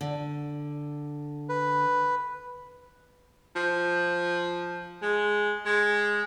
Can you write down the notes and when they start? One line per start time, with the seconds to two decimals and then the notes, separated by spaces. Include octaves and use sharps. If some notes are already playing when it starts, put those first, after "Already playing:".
0.01 D3
1.49 B4
3.56 F3
5.02 G#3
5.66 G#3